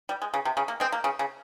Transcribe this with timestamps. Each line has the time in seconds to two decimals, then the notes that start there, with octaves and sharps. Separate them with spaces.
0.09 G3
0.22 G#3
0.34 C#3
0.45 C3
0.57 C#3
0.68 A#3
0.80 G#3 C4
0.92 A#3
1.04 C#3
1.19 C#3